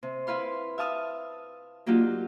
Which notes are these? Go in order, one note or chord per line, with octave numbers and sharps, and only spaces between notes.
C3
E4 B4 F5 C6
E5 F5 A5 D#6 F6
F#3 A#3 D4 D#4 F4 G4